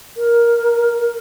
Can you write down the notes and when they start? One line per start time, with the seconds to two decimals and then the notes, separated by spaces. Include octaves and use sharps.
0.17 A#4